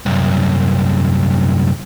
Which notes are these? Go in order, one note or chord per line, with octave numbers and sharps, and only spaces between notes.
C2 F#2